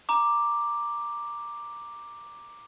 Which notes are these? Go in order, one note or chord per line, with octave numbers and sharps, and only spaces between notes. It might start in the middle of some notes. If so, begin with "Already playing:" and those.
A#5 D6